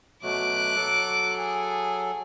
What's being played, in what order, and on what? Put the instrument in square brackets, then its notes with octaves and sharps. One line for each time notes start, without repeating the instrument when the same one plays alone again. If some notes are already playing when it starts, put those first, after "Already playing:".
[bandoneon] B2 F#3 A3 [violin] D6 F#6
[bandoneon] F#3 A4
[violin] G#4